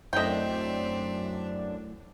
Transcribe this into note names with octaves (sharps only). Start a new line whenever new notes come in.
F#2 A3 C4 D4 E4 D#5 E5 G5